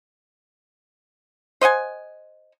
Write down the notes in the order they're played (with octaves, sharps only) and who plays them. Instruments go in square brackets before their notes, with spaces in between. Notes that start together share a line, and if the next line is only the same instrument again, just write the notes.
[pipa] C5 D#5 F#5 G#5